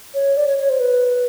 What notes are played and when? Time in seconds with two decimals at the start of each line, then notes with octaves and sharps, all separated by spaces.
0.15 C#5
0.37 D5
0.47 C#5
0.58 C#5
0.69 C5
0.80 B4